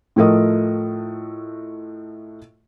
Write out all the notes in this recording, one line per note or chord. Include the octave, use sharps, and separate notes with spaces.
A2 F3 A3 A#4 D#5 D#6